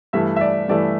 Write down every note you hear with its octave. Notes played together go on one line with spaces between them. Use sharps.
G2 E3 A3 E5
E5
D5
G2 E3 A3 D5